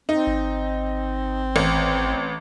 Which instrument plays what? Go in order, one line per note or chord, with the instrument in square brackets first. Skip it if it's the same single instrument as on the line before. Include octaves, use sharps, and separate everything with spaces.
[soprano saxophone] C4 [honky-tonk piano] D#4
[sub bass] G#1
[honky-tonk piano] A1